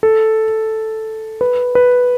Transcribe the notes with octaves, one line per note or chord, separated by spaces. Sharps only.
A4
B4
B4